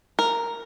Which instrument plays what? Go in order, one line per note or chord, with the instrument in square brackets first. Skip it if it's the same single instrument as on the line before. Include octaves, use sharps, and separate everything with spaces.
[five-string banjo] A#4